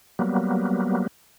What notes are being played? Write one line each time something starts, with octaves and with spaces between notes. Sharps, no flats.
F#3 G3 A#3 B3